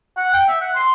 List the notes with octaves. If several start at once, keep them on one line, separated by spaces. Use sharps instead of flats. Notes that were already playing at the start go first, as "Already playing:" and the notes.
F#5
G5
E5
F#5
C6